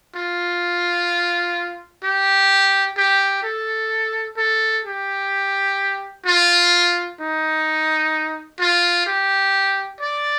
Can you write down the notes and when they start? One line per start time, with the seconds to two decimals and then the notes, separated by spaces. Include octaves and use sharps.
0.15 F4
2.04 G4
2.97 G4
3.43 A4
4.37 A4
4.85 G4
6.26 F4
7.20 D#4
8.60 F4
9.06 G4
10.01 D5